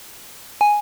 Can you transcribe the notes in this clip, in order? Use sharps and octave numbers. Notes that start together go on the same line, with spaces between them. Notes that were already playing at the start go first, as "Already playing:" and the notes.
G#5